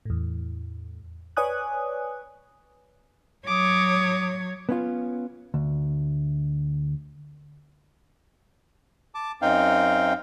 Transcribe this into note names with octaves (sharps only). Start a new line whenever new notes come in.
E2 A2
B4 C#5 D5 G#5 D#6 F#6
F#3 C#5 D6 D#6
B3 C#4 F4
D2
A5 D6
F#2 C4 D#4 F5 G5